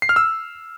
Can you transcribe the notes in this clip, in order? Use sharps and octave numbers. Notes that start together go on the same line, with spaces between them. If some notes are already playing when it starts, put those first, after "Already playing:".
C7
F6
E6